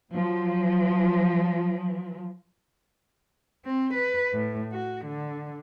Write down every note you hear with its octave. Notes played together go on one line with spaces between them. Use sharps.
F3 F#3
C4
B4
A2
F#4
D3